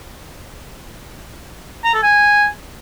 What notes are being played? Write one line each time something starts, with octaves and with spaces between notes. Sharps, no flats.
A#5
A4
G#5